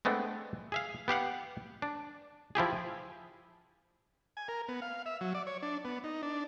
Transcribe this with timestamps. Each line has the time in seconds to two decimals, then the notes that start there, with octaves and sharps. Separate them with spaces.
0.05 G#3 A3 B3 C4 D4
0.72 G#4 E5 F5
1.08 B3 G4 F5 F#5
1.82 D4
2.55 F3 E4 G4 G#4
4.37 G#5
4.48 A#4
4.68 B3
4.82 F5
5.06 E5
5.21 F#3
5.35 D5
5.47 C#5
5.63 D4
5.85 B3
6.04 D#4
6.23 D4